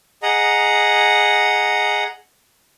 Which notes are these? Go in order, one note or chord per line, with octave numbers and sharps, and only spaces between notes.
G#4 D#5 F#5 A#5